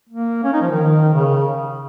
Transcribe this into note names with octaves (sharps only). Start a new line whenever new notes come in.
A#3
C#4
D#4
F3
D#3
C#3